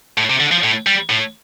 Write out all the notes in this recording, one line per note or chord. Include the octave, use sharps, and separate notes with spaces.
A2
C3
D3
F3
A2
G3
A2